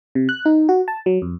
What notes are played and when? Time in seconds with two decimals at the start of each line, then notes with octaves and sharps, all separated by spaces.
0.15 C3
0.29 F#6
0.45 D#4
0.69 F#4
0.88 A5
1.06 F#3
1.22 F2